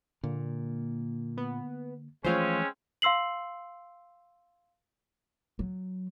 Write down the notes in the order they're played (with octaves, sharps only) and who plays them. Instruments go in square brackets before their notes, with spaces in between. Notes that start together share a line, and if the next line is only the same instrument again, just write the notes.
[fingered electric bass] A#2 [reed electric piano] D3 A#3
[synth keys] B3
[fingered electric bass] E3 F3 A3 [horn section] G#3 C4 C#4 [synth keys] F4 C5
[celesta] F5 C6 E6 C7 F#7
[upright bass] F#3